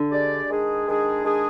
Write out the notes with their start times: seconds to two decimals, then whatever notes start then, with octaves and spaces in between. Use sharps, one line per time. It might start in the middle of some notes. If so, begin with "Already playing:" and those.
Already playing: D3
0.11 G#3 D4 G4 D5
0.49 D#3 G#3 D4 G#4
0.87 D#3 G#3 D4 G#4
1.24 D#3 G#3 D4 G#4